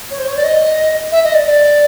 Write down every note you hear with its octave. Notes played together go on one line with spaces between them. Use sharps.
C#5
C5
C#5
D5
D#5
E5
D#5
D5
D5